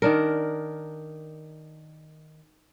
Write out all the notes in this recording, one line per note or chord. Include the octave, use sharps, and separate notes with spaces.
D#3 D4 A#4